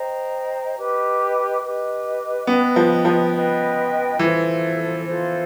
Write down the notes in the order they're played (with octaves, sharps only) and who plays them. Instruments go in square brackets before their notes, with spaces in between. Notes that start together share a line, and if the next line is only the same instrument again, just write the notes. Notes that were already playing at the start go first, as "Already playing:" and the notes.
Already playing: [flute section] C5 D#5 G5 A#5
G4 B4 D#5
G4 B4 D#5
[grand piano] B3 [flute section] B4 D#5 G5
[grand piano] F3
F3
[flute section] B4 D#5 G5
[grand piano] E3 [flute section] F4 A4 C5
[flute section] F4 A4 C5